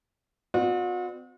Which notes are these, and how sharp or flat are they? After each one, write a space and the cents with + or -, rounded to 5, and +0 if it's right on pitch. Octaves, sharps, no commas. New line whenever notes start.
C4 -40 F#4 -45 D5 +40